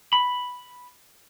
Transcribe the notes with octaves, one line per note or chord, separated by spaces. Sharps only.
B5